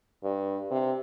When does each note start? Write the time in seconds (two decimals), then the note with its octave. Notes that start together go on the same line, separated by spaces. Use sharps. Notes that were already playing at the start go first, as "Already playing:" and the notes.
0.24 G2
0.71 C3